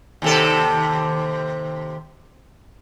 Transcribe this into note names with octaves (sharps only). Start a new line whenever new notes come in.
D#2 C3 A4